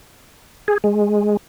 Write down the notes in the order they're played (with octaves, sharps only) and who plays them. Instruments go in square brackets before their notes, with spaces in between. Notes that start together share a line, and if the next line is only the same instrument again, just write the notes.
[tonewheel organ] G#4
G#3